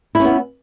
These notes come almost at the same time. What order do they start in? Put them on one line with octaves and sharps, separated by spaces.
E4 C#4 B3